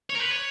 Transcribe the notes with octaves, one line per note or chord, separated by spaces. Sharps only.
C#5
A#4
B4
C#5